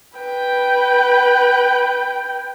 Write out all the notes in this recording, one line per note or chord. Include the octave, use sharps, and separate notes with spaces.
B4 G5